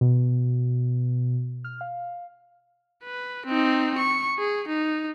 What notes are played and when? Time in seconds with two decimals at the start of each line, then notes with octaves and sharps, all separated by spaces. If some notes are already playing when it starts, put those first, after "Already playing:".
0.01 B2
1.64 F6
1.81 F5
3.04 B4
3.46 C4 D#4
3.98 C#6
4.38 G#4
4.68 D#4